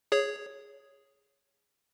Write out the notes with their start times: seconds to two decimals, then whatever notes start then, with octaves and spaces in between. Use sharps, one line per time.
0.12 G#4 C#5